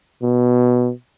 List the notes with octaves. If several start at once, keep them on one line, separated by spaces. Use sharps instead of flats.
B2